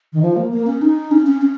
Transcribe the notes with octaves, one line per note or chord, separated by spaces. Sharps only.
D#3
F3
A#3
A#3
C#4
D#4
C#4
C#4
C#4